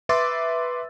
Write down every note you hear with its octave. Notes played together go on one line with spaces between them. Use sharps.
B4 E5 C6 D6 E6 A6